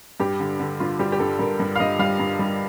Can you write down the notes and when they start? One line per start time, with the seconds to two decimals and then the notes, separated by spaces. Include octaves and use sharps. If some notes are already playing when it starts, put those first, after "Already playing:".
0.20 G2 G4
0.40 D3
0.60 D3
0.80 G2 F4
0.99 G3 G4
1.12 G4
1.19 G2 A4
1.39 G2 A#4
1.60 G2
1.76 F5
1.80 G2 D#5
1.99 G3 F5
2.20 G2
2.39 G3